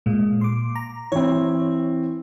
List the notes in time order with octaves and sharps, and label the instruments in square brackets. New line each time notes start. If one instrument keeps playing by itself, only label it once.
[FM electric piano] A#2 G#3
C6 D6
A#5
[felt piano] E3 C4 [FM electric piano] C#5